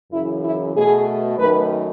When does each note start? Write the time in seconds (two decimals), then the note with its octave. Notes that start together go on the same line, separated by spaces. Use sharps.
0.12 F#2 C#3 E3 E4
0.43 E4
0.75 B2 A3 G#4
1.38 F#2 D#3 A3 B4